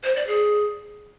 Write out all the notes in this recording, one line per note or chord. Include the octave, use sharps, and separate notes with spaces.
C5
D5
G#4